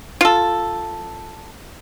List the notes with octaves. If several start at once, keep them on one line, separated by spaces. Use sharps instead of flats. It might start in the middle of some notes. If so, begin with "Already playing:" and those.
F4 A4